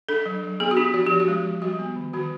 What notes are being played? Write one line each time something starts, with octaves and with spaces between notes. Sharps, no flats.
D4 A4
F#3
F#3
B3 G#4
F#4
D4 G4
F3 F#4
F3 G4
F#4
G#3
F3
G3 F#4
B3
D#3
D#3 F#4